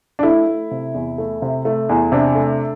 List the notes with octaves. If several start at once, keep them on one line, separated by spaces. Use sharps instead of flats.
D4
A3 E4
A3
C3
E2
A3
C3
A3
E2
C3 D4
A3